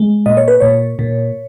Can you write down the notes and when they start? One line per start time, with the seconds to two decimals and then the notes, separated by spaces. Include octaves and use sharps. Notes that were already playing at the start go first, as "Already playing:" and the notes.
Already playing: G#3
0.26 A#2 D#5
0.37 C#5
0.48 B4
0.60 A#2 C#5
0.99 A#2